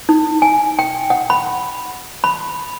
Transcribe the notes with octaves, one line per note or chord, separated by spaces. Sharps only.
D#4
G#5
G5
F#5
B5
B5